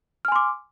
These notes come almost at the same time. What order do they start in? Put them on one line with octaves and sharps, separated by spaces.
F6 G#5 C6 D6